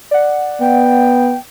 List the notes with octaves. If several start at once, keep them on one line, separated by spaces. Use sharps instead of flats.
D5 F#5
B3 G5